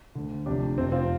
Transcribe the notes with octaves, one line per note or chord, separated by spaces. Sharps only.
D2 D3
F1 F2 C3 D4 G4
F1 F2 C3 C4
C4 F4